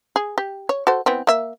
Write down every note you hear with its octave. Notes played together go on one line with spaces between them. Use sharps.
G#4
G4
C#5
F#4 A4 C5
E3 B3 C4
A#3 E5